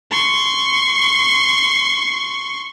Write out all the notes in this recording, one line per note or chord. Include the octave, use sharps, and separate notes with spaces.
C6 C#6